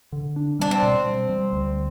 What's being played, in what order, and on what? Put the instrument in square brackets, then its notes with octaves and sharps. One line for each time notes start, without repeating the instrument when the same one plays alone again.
[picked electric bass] D3
D4
[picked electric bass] G3 [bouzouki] D4
[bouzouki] C4
[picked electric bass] B2
G3
G3
D2